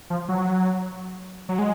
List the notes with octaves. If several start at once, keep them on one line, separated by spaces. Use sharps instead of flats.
F3
F#3
F#3
G#3